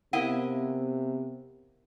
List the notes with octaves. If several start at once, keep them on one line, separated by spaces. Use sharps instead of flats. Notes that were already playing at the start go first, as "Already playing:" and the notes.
C3 B3 E4 A#4 D#5 F5 F#5 G#5